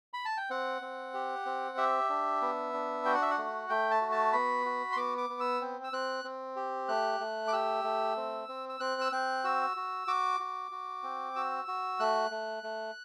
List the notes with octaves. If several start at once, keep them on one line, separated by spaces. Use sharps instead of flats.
B5
A5
G5
C4 F#5
C4
G4
C4
G4 E5
D4
B3
D4
F#4 G5
F#5
E5
F#5
A3
A3 G5
A5
F#4
A5
B3 B5
F#4
C6
B3 D6
D6
B3
E6
C4
E6
C4 F#6
C4
G4
A3 F#6
A3
D6
G4 E6
A3
C4
C4
E6
C4 F#6
E6
C4 F#6
F#4 E6
F#4
F#4 D6
F#4
F#4
C4
F#4 E6
F#4
A3 F#6
A3
A3